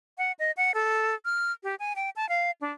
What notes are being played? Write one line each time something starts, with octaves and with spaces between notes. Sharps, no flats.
F#5
D#5
F#5
A4
F6
G4
G#5
G5
A5
F5
D4